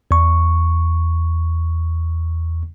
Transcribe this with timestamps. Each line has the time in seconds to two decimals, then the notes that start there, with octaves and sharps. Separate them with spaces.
0.11 E2 C#6